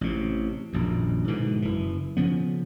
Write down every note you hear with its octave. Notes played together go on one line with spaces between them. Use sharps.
A1 C3
D#1 A#1 F#2
G#2 B2 D3 E3
F#1 E3
C#3 F3 B3